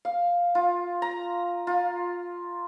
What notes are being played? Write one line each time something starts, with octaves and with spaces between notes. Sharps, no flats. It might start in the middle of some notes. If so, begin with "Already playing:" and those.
F5
F4
A#5
F4